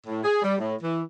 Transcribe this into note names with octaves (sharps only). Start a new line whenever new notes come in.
A2
G#4
G3
A2
E3